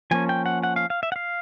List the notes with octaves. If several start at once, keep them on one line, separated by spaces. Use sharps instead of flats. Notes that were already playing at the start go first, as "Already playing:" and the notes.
F3 A#3 C#4 G#5
G5
F#5
F#5
F5
F5
E5
F#5
F5